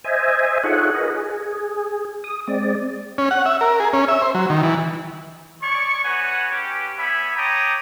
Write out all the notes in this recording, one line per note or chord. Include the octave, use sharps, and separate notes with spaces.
C5 D#5 E5 G#5
D#4 F4 G#4 A4 C#5 F#5
G#4 A#4 B4 D#5
G#4
D#6
G#3 C4 D5
C#4
F#5
E5
A#4
G#4
C#4
E5
C5
F#3
D#3
E3
G#3 C#5 D5 C#6
B3 F#4 B4 C#5 F#5 G#5
C#4 G4 B4
B3 C#5 E5 G#5 B5
C#5 G5 A5 A#5 D6 D#6